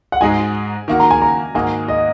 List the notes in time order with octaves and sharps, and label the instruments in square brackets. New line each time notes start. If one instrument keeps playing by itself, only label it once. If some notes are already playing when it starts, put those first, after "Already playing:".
[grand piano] F#5
[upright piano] G#2 G#3 D#4 F#4 [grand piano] G#5
[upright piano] D#3 A#3 F#4
[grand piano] A#5
G#5
A#5
[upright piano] G#2 D#3 A#3 D#4 F#4 [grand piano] G#5
[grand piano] D#5